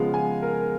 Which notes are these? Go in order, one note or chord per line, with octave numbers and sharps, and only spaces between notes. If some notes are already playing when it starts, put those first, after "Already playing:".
Already playing: C#3 F3 G#3 B3 F5
G#5
A#4